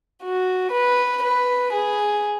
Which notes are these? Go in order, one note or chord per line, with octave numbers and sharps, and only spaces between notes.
F#4
B4
B4
G#4